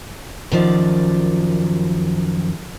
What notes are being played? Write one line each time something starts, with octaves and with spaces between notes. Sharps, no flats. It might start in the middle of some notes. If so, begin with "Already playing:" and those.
F#2 D#3 F3 D5